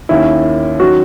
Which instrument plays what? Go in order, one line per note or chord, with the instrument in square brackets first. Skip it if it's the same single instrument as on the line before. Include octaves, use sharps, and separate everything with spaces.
[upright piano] D#2 D#3 A#3 C#4 [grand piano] E4
[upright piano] D#3 F#3 C#4 [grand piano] F#4